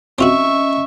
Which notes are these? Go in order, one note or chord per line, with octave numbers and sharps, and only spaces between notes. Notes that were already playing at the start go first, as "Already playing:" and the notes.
C4 C#4 F4 F#4 D#5 E5 C#6 E6